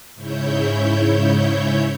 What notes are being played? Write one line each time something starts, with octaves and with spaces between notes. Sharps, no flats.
G#2 C#3 E4 C#5 G6